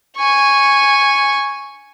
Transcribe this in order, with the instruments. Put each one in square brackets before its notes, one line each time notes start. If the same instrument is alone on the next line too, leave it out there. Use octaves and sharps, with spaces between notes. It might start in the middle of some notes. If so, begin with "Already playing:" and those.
[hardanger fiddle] G#5 C#6